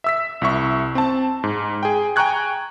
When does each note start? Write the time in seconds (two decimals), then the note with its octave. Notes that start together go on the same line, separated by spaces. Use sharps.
0.04 E5 E6 B6
0.42 C2 E4 E5 C#6
0.95 C4 A5
1.44 G#2
1.83 G#4 G5
2.16 G5 G#5 A#5 C#6 F#6 G#6